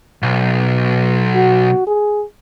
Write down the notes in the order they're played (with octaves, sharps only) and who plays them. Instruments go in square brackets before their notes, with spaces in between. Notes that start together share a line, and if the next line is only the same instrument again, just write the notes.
[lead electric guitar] B1 [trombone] B2
[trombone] F#4
G#4